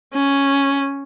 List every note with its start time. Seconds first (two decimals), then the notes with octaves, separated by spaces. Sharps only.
0.14 C#4